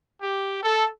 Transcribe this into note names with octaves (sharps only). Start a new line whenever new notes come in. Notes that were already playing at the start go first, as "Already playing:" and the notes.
G4
A4